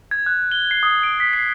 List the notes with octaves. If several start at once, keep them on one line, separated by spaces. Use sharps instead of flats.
G#6
F#6
G7
C7
D#6
D7
B6
C7